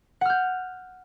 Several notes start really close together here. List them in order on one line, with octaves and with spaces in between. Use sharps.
F#5 F6 G6